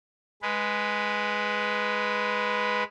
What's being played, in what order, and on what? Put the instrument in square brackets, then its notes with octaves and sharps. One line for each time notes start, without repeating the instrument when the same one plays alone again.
[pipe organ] G#3 B4